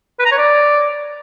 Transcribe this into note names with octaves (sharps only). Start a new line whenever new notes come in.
B4
A#5
C#5
D5